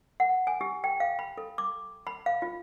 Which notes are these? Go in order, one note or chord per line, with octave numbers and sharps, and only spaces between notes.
F#5
G#5
G4
G5
F5
B5
A4
D6
B5
F5
F4